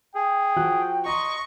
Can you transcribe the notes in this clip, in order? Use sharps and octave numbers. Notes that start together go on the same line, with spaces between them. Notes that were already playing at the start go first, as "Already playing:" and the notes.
G#4 G5
F3 F#4 F#6
D#5 A#5 C6 C#6